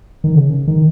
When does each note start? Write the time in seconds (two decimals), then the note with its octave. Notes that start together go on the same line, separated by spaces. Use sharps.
0.24 D#3
0.35 C#3
0.68 D#3